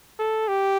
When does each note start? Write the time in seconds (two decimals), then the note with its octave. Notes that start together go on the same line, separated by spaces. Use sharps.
0.19 A4
0.48 G4